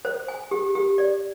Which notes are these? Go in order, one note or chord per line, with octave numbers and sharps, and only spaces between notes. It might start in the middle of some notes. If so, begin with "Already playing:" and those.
C5
G#5
G4
G4
D5